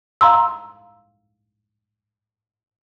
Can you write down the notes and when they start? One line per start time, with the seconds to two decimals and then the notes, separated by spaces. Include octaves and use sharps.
0.21 F5 A#5 C6 E6